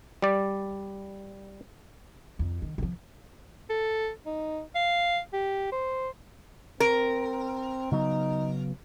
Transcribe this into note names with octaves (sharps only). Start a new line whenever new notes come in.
G3 D5
F2
D#3
D#3 F3
A4
D#4
F5
G4
C5
C4 A#4
C#3 F#3 B3 D#4